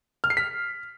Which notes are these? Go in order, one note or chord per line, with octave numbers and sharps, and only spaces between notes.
F6
C7
B6